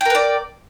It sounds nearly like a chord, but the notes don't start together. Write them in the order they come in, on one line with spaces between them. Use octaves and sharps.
G5 A#4 B4 D5